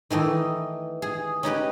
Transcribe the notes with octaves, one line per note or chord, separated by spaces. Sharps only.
D#3 E3 A3 D#4
G#4
C#4 D#4 G4 B4